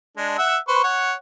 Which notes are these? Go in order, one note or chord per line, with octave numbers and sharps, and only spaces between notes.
G#3 D4
E5 F#5 E6
B4 C5 C#6
C#5 F#5